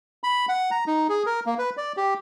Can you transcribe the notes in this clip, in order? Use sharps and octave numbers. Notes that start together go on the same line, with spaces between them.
B5
F#5
A#5
D#4
G#4
A#4
A#3
B4
D5
G4